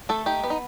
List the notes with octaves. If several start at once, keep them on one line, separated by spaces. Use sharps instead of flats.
A3 A4
D#4 G4
B3
D#4